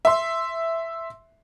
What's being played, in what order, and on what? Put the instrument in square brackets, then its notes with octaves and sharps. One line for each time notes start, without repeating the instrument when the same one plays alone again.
[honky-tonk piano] E5 C6